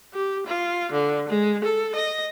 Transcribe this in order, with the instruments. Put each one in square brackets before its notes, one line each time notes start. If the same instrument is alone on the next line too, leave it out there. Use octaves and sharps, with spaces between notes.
[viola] G4
F4
D3
G#3
A4
D#5